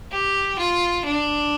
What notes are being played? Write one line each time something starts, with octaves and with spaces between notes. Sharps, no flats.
G4
F4
D4